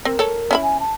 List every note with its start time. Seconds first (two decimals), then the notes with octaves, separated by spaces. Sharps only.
0.05 C4 A#4
0.19 A4 C#5
0.51 C#4 E4 B5
0.63 G#5
0.80 A5